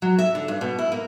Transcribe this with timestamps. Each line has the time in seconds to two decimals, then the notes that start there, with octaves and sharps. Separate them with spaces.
0.02 F#3
0.19 E5
0.35 D3
0.48 G2
0.61 B2
0.79 E4
0.92 A#3